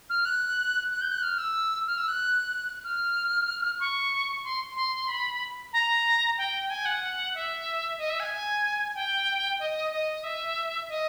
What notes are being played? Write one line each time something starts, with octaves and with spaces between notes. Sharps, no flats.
F6
F#6
F#6
G6
F#6
F6
E6
F6
E6
F#6
F6
C#6
C6
C6
B5
A#5
G5
G#5
F#5
E5
D#5
E5
G#5
G5
D#5
D#5
E5
D#5